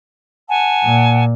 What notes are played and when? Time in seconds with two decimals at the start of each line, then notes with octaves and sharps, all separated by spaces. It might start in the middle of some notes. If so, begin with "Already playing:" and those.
0.49 F#5 G#5 A5
0.84 A#2